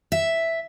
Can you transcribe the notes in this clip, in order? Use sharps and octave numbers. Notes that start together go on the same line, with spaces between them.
E5